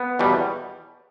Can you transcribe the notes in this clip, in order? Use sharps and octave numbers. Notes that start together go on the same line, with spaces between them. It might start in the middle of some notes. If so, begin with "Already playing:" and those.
Already playing: B3
E2 B2 G3